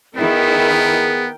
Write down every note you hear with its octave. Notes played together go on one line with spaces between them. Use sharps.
D#3 B3 E4 G#4 A#4 G5